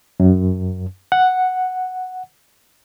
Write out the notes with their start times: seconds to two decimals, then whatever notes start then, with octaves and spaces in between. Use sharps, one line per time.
0.20 F#2
1.12 F#5